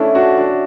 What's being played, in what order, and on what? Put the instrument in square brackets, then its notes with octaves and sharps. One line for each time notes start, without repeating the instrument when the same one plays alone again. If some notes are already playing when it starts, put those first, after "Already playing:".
Already playing: [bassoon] A3 [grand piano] C#4 D4 E4
[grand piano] D4 F#4
D4 F#4